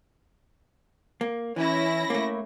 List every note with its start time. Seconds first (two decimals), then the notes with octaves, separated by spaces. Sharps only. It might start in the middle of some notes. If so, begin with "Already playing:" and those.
1.21 A#3
1.56 E3 C#4 E4 A#6
2.10 A3 A#3